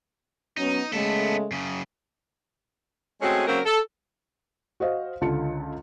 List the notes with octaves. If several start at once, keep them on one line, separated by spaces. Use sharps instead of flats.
F#3 B3 C#4 D#4
C#3 G#3 A3 B3 A4
F#2 C#3
G#3 A3 C4 C#4 F#4 G#4
C#3 F#3 A#3 C4 C#4 A#4
A4
F#4 C5 D#5 F5
C#2 D3 F4 A5 C#7